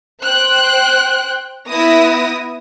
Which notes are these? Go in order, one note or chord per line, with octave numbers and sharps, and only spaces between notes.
C5 G5 F#6
B3 E4 D#6 A#6